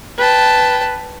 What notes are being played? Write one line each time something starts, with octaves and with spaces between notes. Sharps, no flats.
B4 G5 A5